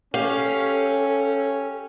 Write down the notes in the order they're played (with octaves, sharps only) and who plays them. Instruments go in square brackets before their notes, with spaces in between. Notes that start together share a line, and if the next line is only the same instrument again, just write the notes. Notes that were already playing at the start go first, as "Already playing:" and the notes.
[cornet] C#4 [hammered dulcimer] G4 [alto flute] A4 [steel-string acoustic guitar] F5